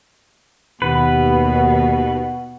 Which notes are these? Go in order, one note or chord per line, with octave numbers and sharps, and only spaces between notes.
D#2 B2 F#4 B4